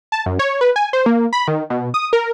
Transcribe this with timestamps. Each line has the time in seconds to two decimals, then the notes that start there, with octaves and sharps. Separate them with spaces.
0.12 A5
0.26 F#2
0.39 C#5
0.61 B4
0.76 G#5
0.93 C5
1.06 A#3
1.33 B5
1.48 D#3
1.70 B2
1.94 D#6
2.13 A#4